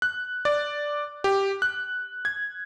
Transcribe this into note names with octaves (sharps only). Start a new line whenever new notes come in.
F#6
D5
G4
F#6
G#6